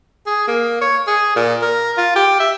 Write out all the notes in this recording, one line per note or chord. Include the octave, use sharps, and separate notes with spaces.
G#4
A#3
C#5
G#4
A#2
A#4
F4
G4
E5